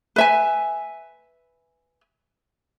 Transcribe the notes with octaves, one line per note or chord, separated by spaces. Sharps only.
B4 E5 G#5